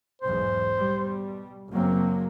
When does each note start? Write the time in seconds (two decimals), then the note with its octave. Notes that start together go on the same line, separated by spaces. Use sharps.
0.21 B1 E2 G#2 C5
0.76 B2 G3
1.71 F#1 F#3 A#3 C4